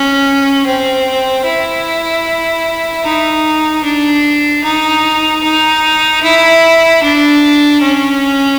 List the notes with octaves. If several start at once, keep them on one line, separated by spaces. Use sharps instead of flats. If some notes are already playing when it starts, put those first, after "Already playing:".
Already playing: C#4
C4
E4
D#4
D4
D#4
D#4
E4
D4
C#4